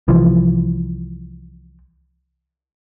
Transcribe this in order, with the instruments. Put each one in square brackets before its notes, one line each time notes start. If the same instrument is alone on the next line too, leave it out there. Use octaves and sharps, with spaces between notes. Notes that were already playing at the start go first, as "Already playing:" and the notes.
[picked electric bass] C2 E3 F3